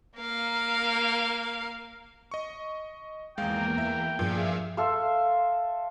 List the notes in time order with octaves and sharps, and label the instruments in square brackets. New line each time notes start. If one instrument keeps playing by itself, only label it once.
[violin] A#3 F5
[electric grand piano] D#5 C#6
[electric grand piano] G#1 G#3 F5 [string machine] E2 A#3 A#4 [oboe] G5
[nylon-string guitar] E3 [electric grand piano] E5
[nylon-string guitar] G2 F3 [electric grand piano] A#2 [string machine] G#4 E5 F5
[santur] A4 E5 F5 C6